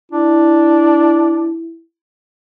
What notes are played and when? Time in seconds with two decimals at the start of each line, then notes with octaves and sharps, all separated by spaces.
0.12 D4 E4